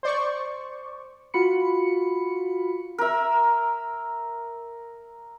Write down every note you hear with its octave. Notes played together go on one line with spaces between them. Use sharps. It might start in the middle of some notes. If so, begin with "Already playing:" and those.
C5 D5 C#6
F4 F#4 B5 C#7
A#4 E5